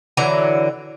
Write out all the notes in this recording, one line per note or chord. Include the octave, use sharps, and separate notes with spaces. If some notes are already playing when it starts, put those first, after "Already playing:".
D3 E3 F#3 A#5